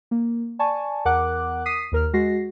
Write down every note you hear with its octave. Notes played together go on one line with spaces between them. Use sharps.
A#3
D5 G#5 A5 C#6
E2 A#4 F#5 D6 F#6
D#6 B6 C7 D#7
D#2 A#4 F6
G#3 F#4 A#6 C7